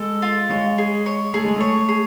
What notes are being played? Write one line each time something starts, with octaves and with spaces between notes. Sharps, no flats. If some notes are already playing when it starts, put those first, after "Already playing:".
Already playing: G#3 A4
F4
G#3 C#5
G#4
C#5
A3 G#4
G#3
A3 C#5
G#4